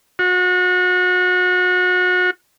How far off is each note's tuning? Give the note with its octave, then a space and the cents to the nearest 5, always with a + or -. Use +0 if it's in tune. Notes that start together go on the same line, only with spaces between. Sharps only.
F#4 -30